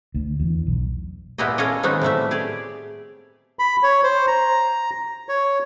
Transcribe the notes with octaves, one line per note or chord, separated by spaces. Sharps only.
D2
E2
B1
A#2 G#3 B3 E4 G4 D#5
C#4 F4 G#4 A4 C#5 D#5
D#3 F#3 G#3 B3 C4 D#4
A2 G3 A3 E5
G4 G#4 D5
B5
C#5
C5
A#5
C#5